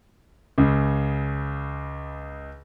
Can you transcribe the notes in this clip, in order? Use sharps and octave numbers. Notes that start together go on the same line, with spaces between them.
C#2 C#3